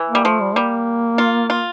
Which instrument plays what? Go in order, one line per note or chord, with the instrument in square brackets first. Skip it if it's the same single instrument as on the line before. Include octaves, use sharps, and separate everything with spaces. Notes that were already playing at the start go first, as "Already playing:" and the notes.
Already playing: [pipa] E3
[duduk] A#3
[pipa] G3
[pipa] F3 [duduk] A3
[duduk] G3
[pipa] G3 [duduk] A#3
[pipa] F4
F4